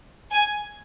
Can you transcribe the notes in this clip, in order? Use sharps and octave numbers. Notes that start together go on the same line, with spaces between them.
G#5